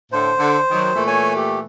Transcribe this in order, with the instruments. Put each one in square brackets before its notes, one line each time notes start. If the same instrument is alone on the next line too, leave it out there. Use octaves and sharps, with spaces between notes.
[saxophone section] A2 D3 [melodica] C5
[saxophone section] D3
D#3 F#3
A#2 E3 A3
[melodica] C#5 G#5
G4